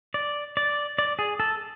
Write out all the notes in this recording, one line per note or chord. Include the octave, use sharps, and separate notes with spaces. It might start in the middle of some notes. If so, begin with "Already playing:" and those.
D5
D5
D5
G#4
A4